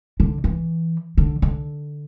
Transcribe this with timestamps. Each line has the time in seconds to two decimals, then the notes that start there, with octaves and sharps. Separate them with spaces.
0.20 D3
0.44 E3
1.17 D3
1.42 D3